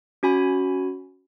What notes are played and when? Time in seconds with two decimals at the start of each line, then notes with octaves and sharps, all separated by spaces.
0.23 C#4 F#4 G#5 B5